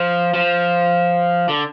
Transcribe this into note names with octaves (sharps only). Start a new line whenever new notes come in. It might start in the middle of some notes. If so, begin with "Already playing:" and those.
Already playing: F3
F3
D3